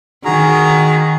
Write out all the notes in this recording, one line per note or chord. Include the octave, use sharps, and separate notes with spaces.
D#3 F#4 G#4 A#5